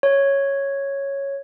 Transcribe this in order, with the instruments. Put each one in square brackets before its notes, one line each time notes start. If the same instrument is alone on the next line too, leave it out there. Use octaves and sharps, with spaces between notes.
[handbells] C#5